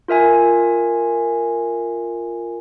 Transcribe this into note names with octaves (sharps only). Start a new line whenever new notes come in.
F4 A#4 E5 G#5